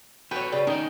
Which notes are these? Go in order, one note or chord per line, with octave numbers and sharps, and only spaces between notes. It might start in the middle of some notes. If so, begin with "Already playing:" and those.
F#4 A4 B4 C#5 G5
C#3 D5 G5
D#3 C#4 D#4 G5